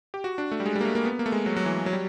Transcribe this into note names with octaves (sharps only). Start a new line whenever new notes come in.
G4
F#4
D4
A3
G3
G#3
G3
A#3
A3
A#3
B3
A#3
A3
G#3
F#3
F#3
E3
F#3
G3